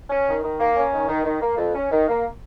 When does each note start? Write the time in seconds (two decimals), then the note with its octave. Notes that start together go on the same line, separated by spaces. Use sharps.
0.10 C#4
0.26 D#3
0.42 D#3
0.59 A#3
0.76 C#4
0.92 D#3
1.08 D#3
1.24 D#3
1.41 A#3
1.57 F2
1.75 C#4
1.91 D#3
2.08 A#3